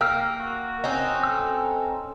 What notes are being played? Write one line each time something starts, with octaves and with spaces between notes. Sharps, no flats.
A#3 G5 E6 F6
F#4
C4 C#4 D#4
A4 E6